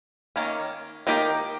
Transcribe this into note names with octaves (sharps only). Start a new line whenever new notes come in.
D#3 A#3 C#4
D#3 A#3 D#4 G4 A#4